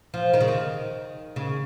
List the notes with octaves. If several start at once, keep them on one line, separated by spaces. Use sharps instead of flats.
F3
D#3
C#3
D#3
C#3